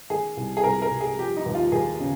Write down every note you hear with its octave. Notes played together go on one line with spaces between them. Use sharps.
D#3 G#4
C2
G#4
C2 A#4
A#4
C3
G#4
F3 G4
D#4
D#2
F4
D#2 G#4
C#3